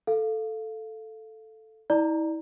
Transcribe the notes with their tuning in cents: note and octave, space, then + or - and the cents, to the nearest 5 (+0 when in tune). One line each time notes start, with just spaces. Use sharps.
A4 +0 F5 -5
E4 -40 D5 +20 A#5 +0